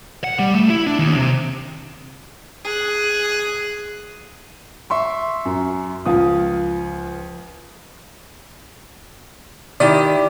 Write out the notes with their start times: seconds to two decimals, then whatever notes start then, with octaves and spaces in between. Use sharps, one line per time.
0.24 F#5
0.39 G3
0.55 A3
0.70 E4
0.87 D4
0.99 D#2
1.17 C3
2.64 G#4 F#6
4.90 E5 C6 C#6
5.45 F#2
6.06 C#2 F3 F5 D#6
9.80 D#3 E4 G4 D5